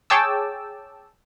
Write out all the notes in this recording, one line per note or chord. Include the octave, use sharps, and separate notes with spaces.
G#4 C#5 G5 A5 D6 E6